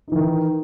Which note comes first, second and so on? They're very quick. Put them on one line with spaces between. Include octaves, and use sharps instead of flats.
D#4 E3 D#3